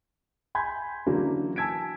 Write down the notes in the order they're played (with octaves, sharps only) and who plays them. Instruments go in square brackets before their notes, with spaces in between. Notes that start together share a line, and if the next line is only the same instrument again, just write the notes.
[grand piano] G#5 B5 C6 G6 G#6
D3 E3 F#3 A#3 C#4 D4
G#5 A5 E6 G#6 B6 D7